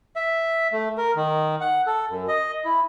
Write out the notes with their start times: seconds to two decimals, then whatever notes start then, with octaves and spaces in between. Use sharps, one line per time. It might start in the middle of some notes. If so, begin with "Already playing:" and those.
0.16 E5
0.72 A3
0.98 A#4
1.16 D#3
1.61 F#5
1.87 A4
2.10 F#2
2.28 D#5
2.65 E4